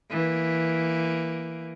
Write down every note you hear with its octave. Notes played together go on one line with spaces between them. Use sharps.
E3 A#3